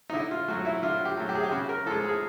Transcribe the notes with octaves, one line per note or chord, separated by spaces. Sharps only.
D#4
D3 E4
F4
F#3 A3 F#4
E4
D3 F4
G4
F#3 A3
G4
G#4
G4
C#3 F#4
A#4
F3 G#3 A4
G#4